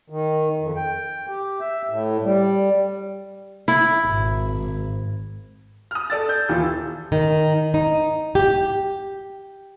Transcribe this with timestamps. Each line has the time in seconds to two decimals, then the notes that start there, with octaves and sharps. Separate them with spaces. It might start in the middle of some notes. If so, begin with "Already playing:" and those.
0.10 D#3
0.60 F2
0.76 G5
1.29 G4
1.60 E5
1.90 A2
2.23 G3
3.68 E4
4.07 G#1
5.91 D#6 F6
6.10 A4 D5 E6 A6
6.29 G6
6.49 D#1 E3 F4 E6
7.12 D#3
7.74 D#4
8.35 G4